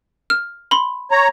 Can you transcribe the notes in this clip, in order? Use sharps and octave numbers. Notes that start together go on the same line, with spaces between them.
F6
B5 C6
C#5 A#5